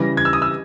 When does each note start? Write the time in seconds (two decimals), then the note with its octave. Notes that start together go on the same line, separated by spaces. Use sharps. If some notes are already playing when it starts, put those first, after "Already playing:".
Already playing: C#3 E3 G3 A#6
0.17 G#6
0.25 E6
0.33 D#6
0.42 E6